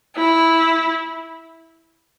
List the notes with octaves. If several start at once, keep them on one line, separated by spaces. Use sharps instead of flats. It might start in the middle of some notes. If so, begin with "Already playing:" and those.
E4